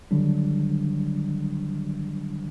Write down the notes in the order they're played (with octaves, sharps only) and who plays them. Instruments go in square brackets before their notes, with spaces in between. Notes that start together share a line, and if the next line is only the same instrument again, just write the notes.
[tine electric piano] D3 D#3 F#3 G3 D4